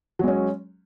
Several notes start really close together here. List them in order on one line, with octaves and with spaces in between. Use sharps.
F#3 G#3 C#4